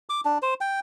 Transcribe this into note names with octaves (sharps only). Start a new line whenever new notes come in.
D6
D4
C5
G5